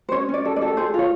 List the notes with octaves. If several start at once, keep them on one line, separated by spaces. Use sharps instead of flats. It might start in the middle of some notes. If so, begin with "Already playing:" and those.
C5
C#4 C#5
C#4
D5
A4
D5
A4
G#4 C5
F4 C#5